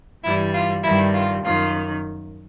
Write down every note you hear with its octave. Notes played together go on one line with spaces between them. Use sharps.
G2 E3 G3 E4
F4
G2 D#3 G3 E4
F4
F#2 D#3 F4